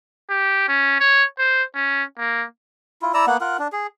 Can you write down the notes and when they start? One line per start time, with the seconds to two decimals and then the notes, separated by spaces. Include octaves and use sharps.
0.30 G4
0.68 C#4
1.00 C#5
1.39 C5
1.75 C#4
2.18 A#3
3.02 E4 F4
3.14 E4 D5 A#5 E6
3.27 A#3 B3 F#5
3.41 F4 A#4 F#5
3.59 D4
3.72 G#4